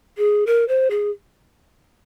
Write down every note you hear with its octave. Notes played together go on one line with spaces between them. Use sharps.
G#4
A#4
C5
G#4